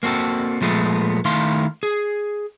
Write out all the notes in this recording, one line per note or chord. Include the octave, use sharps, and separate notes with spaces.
A#3 C4 F#4 A4
A#2 F3 G#3 A3 B3
D#3 A3 E4 F5 C6
G#4